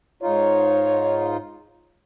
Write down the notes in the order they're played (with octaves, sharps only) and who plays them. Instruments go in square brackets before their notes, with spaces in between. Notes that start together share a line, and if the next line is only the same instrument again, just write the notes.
[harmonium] G#2 D#4 F4 [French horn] C#5